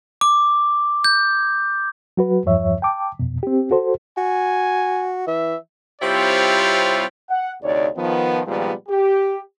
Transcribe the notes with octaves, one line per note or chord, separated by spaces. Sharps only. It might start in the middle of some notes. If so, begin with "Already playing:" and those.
D6
G6
F#3 F#4 B4
E2 G2 F3 C#5 E5
G5 A5 D6
F2 B2
C4 G4
F#4 A4 C5
F#4 G#5
E3 E5
C3 G3 C4 E4 F4 C#5
F#5
D2 C3 D#4 C#5 D5
D#3 F3 B3
A#2 D#3 F3 G3 G#3 B3
G4